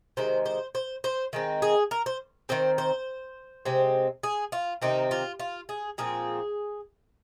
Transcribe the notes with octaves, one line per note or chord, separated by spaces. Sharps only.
C3 D#3 G#3 C5
C5
C5
C5
D#3 G#3 C4
G#4
A#4
C5
D#3 C4 C5
C5
C3 G#3 C4
G#4
F4
C3 D#3 C4 D#4
F4
F4
G#4
A#2 F3 C4 G#4